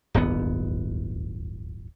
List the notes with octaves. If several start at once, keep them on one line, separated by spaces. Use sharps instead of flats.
D1 G1 D#2 B3